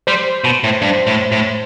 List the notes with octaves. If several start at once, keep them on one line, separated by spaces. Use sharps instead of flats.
G3 C5
B2
A2
G2
A2
A2